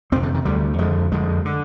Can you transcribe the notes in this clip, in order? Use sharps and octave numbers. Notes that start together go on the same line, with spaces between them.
F2 C3 C4
D3
D#3
D2 D3 G3
F2 D3 G#3
F2 D3 G#3
D3